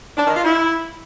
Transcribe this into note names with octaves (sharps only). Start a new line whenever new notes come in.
D4
D#3
F4
E4